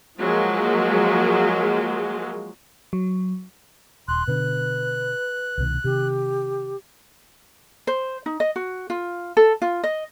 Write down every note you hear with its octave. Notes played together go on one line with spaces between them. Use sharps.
F3 F#3 G#3 A#3
F#3
D#1 C6 F#6
B2 D3 B4
C2 B2 D#3
C3 D#3 G4
C5
D#4
D#5
F#4
F4
A4
F4
D#5